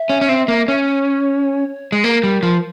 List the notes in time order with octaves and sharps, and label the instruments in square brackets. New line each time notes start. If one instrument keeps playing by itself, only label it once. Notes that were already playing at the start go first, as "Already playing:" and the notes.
Already playing: [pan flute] E5
[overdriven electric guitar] C#4
C#4
C4
A#3
C#4
[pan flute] C#5
[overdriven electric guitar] G#3
[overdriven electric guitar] A#3 [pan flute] A#4
[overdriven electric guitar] G3
F3